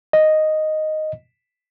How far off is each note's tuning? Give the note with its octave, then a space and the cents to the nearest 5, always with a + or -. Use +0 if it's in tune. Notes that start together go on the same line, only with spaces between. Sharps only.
D#5 +0